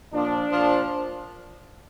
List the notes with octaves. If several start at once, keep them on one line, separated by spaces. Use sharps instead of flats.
A#2 F3 D4
A#2 F3